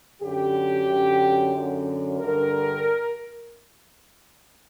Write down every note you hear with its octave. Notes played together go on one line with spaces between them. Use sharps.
F#2 D3 G4
F#2 D3
F#2 D3
G2 D3 A#4